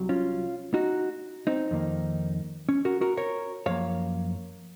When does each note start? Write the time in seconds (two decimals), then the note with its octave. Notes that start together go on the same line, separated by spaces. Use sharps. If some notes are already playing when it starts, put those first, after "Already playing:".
Already playing: C2 C3 F#3
0.09 C#4 F4
0.74 D#4 F#4
1.47 C4 D#4
1.71 F2 D#3 A#3
2.69 C#4
2.85 F#4 A#4
3.01 F#4 A#4
3.17 A#4 C#5
3.66 F#2 F3 A#3 C#5 F5